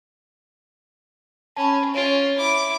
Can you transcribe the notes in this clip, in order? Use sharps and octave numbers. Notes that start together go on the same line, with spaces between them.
C#4 A5 B5
C#4 F4 C#5 D7
E4 D6